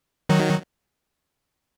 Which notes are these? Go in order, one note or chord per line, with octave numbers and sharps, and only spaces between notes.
D#3 F#3